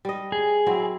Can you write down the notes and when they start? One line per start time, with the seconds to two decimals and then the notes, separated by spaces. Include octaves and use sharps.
0.05 G3 D#5
0.32 G#4
0.67 F#3 C4 E4